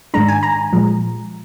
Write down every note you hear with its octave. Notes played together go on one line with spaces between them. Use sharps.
G#2 D#3 G#3 D4 A#5
G#5
A#5
A#2 F3 G#3